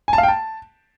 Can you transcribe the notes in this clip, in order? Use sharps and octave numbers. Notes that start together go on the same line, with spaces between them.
G#5
A5
F5
G5
A5